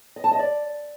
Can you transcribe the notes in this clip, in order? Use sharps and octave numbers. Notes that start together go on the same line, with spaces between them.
D#5
A5
D#5
D5